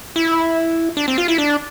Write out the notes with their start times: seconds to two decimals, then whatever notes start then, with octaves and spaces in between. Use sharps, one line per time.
0.16 E4
0.97 D4
1.08 C4
1.18 F4
1.28 E4
1.38 D4